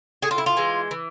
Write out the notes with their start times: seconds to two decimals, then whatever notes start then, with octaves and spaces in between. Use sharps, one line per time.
0.22 A2 G#4
0.31 F4
0.38 E4
0.46 F4
0.57 E3 G#3
0.91 E3